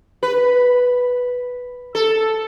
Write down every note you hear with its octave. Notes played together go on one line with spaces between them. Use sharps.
B4
A4